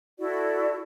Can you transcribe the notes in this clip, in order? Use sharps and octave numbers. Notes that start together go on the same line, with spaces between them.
E4 F#4 A4 D5